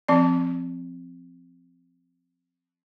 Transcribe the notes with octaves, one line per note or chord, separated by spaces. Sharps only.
F3 C4 D5